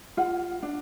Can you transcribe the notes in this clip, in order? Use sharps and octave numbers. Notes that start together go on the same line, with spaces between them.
F4 F#5
D4